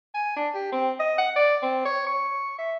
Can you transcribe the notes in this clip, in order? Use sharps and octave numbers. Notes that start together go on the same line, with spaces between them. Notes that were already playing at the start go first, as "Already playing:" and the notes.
G#5
D4
G4
C4
D#5
F#5
D5
C4
C#5
C#6
E5